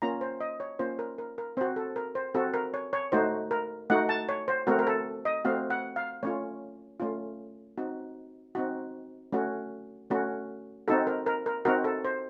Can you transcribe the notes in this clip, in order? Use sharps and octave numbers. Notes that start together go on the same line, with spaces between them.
A#3 C#4 F4 A#5
C5
D#5
C#5
A#3 C#4 F4 C5
A#4
A#4
A#4
C4 F#4 C5
A4
A#4
C5
C4 F#4 A4
A#4
C#5
C#5
A3 D#4 F#4 C5
A#4
A3 D#4 F#4 F#5
A5
C#5
C5
A3 C4 F#4 A#4
A#4
A4
D#5
A3 C4 F#4 F5
F#5
F5
A3 C#4 F4 C#5
A3 C#4 F4
C4 D#4 F#4
C4 D#4 F#4
A3 C#4 F#4
A3 C#4 F#4
C4 D#4 F#4 A4
A#4
A#4
A#4
C4 D#4 F#4 A#4
A4
C5